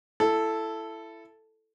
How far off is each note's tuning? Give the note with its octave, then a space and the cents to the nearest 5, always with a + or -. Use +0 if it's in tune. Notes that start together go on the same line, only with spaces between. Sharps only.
E4 +20 A4 +0